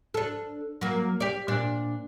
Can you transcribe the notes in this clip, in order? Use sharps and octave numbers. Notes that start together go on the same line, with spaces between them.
D4 A4
F#3 A#3
G4 D5
A#2 D4 D5